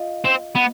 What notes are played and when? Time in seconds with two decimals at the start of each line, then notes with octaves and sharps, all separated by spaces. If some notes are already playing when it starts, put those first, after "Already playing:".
Already playing: F4 D#5
0.25 C4
0.55 B3